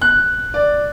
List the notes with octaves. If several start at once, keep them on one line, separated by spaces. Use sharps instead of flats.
F#6
D5